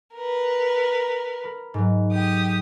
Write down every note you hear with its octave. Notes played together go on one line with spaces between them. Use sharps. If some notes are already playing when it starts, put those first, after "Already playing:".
A#4 B4
A#4 B5
G#2 F#3
G4 D#6